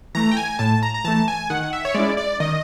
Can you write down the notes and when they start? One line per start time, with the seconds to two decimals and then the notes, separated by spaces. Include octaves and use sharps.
0.15 E3 A3 A#5
0.31 G5
0.37 G#5
0.59 A2 A5
0.83 A#5
0.94 A#5
1.04 E3 A3 A5
1.28 G#5
1.50 D#3 F#5
1.73 E5
1.85 C#5
1.95 G#3 C#4 E4 D5
2.17 D5
2.40 D#3 D#5